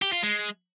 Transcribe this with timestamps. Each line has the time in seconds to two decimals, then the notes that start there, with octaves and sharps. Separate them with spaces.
0.02 G4
0.12 F4
0.23 G#3